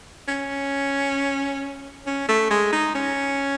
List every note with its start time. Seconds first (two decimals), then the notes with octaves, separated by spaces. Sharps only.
0.28 C#4
2.06 C#4
2.28 A3
2.50 G#3
2.72 D#4
2.94 C#4